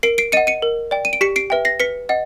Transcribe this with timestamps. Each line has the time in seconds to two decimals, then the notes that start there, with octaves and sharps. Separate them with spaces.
0.03 A#4 C7 D7
0.18 C7 D7
0.32 D#5 F#5 C#7 D#7
0.47 C#7 D#7
0.62 A#4
0.91 D5 G5
1.05 D#7
1.13 D7
1.21 G4 B6 C#7
1.36 C7 D7
1.50 B4 E5 G5
1.65 A#6 C7
1.80 B4 B6 C#7
2.09 D#5 F#5